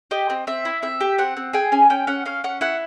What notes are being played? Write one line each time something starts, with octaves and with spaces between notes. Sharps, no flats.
G4 D#5
C4
C4 E5
E4
C4 E5
G4
C4 F#5
C4
G#4 G5
C#4 G#5
C#4 G5
C#4 F#5
C#4 F5
C#4 F#5
E4 F#5